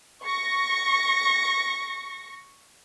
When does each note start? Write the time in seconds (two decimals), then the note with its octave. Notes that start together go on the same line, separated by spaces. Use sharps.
0.23 C#6 A#6